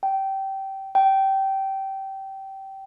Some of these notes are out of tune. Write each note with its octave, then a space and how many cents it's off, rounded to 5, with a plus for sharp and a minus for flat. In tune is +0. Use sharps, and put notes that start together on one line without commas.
G5 -20
G5 -20